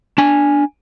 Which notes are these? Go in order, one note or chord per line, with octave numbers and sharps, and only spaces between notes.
D4 G#5